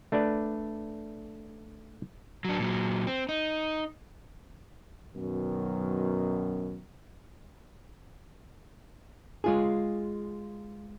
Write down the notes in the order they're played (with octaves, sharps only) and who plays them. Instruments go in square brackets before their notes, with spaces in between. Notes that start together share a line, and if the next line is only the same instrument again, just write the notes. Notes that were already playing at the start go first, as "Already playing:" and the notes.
[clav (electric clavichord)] A3 D4 B4 D5
[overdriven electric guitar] F#3 D4
A#2 F#3
C4
D#4
[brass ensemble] F#2 B2 D#3
[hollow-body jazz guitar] G#3 F4 G#4